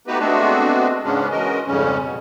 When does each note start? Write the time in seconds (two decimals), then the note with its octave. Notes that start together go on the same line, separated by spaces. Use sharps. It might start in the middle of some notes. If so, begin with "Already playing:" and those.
0.07 A3 B3 D#4 F#4 G4 B4
0.19 G#3 A3 B3 C4 D4 F#4
1.04 G#2 C#3 G#3 B3 C#4 D4
1.31 E3 G#3 C#4 F#4 A#4 D#5
1.66 F2 G#2 C#3 G3 C#4
2.00 B2